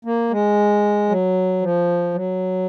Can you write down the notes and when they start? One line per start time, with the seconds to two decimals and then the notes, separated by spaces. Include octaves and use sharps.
0.05 A#3
0.31 G#3
1.09 F#3
1.61 F3
2.14 F#3